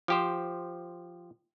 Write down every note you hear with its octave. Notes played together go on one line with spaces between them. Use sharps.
F3 G4 C5